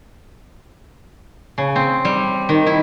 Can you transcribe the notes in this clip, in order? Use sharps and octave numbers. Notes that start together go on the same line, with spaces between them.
C#3
C4
G3
D#3
E4